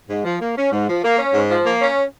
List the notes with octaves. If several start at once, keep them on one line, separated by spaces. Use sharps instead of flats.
G#2
F3
A#3
C#4
G#2
F3
A#3
C#4
G#2
F3
A#3
C#4